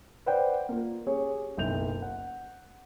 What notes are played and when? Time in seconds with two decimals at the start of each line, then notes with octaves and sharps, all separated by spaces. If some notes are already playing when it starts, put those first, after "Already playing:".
0.26 B4 C5 D5 F#5 G5
0.69 A#3 F4
1.07 C#4 G4 G#4 C#5
1.57 F#1 B1 G6 F7
2.02 F#5